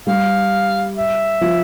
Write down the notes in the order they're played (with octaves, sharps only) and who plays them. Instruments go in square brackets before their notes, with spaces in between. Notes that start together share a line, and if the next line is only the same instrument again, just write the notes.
[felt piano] G3 [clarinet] F5
[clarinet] E5
[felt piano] F3